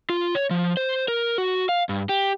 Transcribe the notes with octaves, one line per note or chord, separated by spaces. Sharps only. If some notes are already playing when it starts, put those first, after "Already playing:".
F4
C#5
F3
C5
A#4
F#4
F5
G2
G4